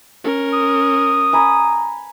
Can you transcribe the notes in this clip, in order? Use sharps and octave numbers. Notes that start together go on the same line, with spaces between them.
C#4 A#4
D#6
G#5 A#5 B5